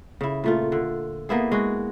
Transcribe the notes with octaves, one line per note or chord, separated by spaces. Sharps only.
C#3 E4
A#2 A3 F4
D3
A#3 B3 E4 G#4
G#3 F#4